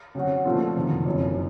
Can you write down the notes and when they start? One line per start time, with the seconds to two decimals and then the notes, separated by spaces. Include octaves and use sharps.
0.15 C#3 F#3 C4 F#4
0.45 A#2 F3 A3 C4 F4
0.76 F#1 F2 C3 D#3
1.06 F#1 F#2 F3